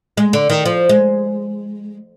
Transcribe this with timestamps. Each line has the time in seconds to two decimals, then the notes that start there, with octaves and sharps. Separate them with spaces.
0.17 G#3
0.33 D3
0.50 D#3
0.66 F3
0.89 G#3